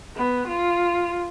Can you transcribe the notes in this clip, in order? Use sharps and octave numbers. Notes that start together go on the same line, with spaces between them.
B3
F4